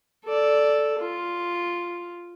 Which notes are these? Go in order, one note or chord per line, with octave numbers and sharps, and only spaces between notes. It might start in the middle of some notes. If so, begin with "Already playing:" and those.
A4 D5
F4